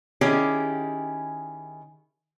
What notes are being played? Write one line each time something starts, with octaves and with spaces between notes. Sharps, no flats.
D#3 C#4 E4 G4 G#4